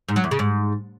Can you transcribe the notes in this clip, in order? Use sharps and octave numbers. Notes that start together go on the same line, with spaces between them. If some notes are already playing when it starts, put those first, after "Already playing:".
G#2
F#3
E2
C#3
G#2